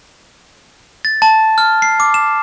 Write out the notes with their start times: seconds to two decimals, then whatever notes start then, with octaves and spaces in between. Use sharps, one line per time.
1.05 A6
1.22 A5
1.58 F6
1.82 C7
2.00 D6
2.14 E7